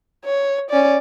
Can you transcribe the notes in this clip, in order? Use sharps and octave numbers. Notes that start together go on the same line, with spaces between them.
C#5
C#4 D5